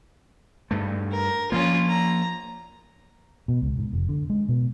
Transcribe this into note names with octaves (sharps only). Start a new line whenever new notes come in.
G2 A3
A#4
F3 A#3 C#4 F4
A#5
B2
C#2
G#2
F1
D3
G#3
B2